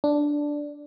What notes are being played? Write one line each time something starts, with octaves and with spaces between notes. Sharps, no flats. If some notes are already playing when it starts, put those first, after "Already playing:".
D4